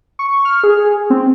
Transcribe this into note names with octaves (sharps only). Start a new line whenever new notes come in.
C#6
F6
G#4
C4